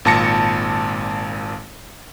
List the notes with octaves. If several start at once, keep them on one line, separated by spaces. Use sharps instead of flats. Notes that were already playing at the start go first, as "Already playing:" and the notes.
G#1 A#2 A5 A#6 C#7